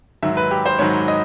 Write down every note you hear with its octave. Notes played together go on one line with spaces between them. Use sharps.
G#2 D#3 F#3 E5
B4
G4
C5
G#2 D#3 F#3 C#5
D#5